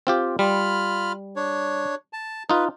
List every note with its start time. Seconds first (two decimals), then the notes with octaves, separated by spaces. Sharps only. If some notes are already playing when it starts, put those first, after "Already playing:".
0.07 C4 F4 G4
0.39 G3 F4 B5 F6
1.36 D4 C#5
2.13 A5
2.50 D#4 F4 B4